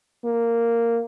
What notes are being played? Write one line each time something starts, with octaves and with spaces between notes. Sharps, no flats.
A#3